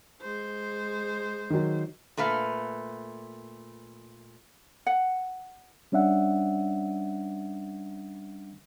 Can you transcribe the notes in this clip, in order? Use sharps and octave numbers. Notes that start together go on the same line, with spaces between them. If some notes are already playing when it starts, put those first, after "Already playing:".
G#3 C5
D#3 F#3
A#2 A3 B4 F5
F#5
G3 C#4 D4 E5 F#5